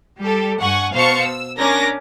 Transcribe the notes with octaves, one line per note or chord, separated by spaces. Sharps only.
G3 G4 A4
G2 F#5 G#5 C#6
B2 C5 F5 A5 C#6 C#7
E6
C#4 D4 A#4 D6 A#6